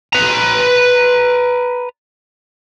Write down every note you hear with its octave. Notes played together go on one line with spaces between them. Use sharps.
B4 A#5